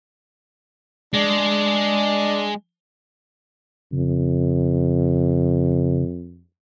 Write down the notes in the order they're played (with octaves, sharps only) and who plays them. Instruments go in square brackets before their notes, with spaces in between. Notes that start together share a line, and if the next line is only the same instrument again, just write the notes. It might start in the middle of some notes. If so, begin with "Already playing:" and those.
[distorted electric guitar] G#3 [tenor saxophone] D4
[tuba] F2 [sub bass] C#3